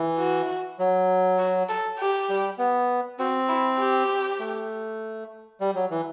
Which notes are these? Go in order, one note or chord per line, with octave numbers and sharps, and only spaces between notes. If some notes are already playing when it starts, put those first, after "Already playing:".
Already playing: E3
F#4
F#3
F#4
A4
G4
G3
B3
C4 F#4
E4
G4
A3
G3
F#3
E3